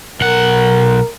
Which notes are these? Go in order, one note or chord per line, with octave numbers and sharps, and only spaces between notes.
B1 A#4 F#5